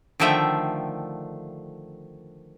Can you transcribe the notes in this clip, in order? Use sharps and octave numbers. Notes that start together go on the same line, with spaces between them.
D3 D#3 F3 A3 E5 G5